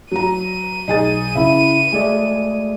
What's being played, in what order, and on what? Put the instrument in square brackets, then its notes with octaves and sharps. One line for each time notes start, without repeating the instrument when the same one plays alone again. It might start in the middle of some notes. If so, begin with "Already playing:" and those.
[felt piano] F#3 A#5 [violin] D#7
[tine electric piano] B1 [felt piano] D#4 G#4 A6
[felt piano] C#3 [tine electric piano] E4 E5
[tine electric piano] G#3 A3 D5 [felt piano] G#4